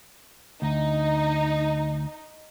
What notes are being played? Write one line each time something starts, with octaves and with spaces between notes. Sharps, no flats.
D2 D#4